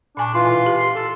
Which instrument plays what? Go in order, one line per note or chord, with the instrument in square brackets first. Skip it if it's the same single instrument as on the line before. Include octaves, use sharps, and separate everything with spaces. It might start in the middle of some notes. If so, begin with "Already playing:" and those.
[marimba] A#2 G#5 C#6 [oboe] D4
[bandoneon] E3 F4 [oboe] C6
[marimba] B2
G4
[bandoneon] A4